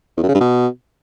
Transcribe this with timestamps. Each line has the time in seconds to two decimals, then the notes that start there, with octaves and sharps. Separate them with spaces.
0.17 E2
0.23 F#2
0.29 C#3
0.35 G2
0.40 B2